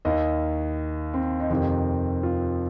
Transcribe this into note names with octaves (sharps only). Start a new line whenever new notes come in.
D#2 D#3 D#5
C4
D#4
F2 C3 D#3 C4
F4